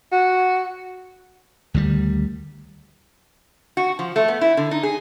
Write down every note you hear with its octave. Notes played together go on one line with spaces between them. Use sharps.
F#4
D2 D#3 E3 G3
F#4
F3
A3
B3
E4
D3
D#4
G#4